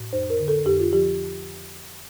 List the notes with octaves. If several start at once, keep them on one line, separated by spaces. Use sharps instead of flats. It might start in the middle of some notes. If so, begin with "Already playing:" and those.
Already playing: A2
F2 C5
A#4
D3
A4
F2 G4
F4
F3 G4